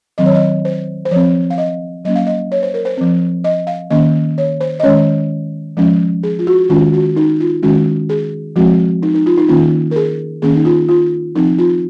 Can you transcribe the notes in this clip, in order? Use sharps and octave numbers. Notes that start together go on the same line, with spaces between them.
D#3 F#3 C4 D#5
C#5
D#5
C5
C5
F3 C4 C#5
F5
D#5
F#3 A#3 C#4 D#5
F5
D#5
C#5
C5
A#4
C5
F3 C4
D#5
F5
D#3 A#3 C#4 D#5
C#5
C5
D#5
D#3 G#3 C#4 C#5
F3 G#3 C#4
G#4
F4
F#4
D#3 G#3 C#4 F4
F#4
D#4
F4
D#3 G#3 C#4 F#4
G#4
F3 G#3 C4 F#4
D#4
D#4
F4
D#4
D#3 A#3 C#4 F4
A#4
G#4
D#3 A#3 C#4 G#4
D#4
F4
F4
F3 C4 D#4
F4